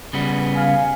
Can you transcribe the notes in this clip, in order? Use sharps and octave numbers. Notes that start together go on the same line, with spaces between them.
C#3 G3 B3
F5 G#5